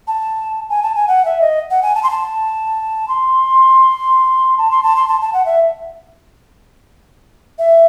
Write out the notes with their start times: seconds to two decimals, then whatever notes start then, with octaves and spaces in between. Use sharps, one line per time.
0.07 A5
0.70 G#5
0.83 A5
0.95 G#5
1.08 F#5
1.25 E5
1.41 D#5
1.70 F#5
1.83 G#5
1.95 A5
2.03 C6
2.11 A5
3.08 C6
4.58 A5
4.71 C6
4.83 A5
4.96 C6
5.08 A5
5.21 A5
5.33 F#5
5.46 E5
7.59 E5